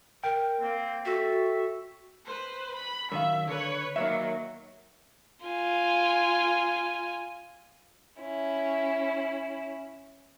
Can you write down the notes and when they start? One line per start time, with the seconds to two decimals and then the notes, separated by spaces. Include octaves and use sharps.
0.24 A#4 G5
0.60 A#3 C4
1.05 F#4 A4 E5
2.25 B4 C5
2.75 B5
3.12 F#2 D#3 E5 F5
3.48 D3 B4 C#5
3.96 D#3 F#3 A#3 C#5 E5
5.46 F4 G#5
8.22 C#4 E4